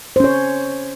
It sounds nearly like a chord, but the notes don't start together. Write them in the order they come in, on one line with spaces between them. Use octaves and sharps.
C5 C#4 C#5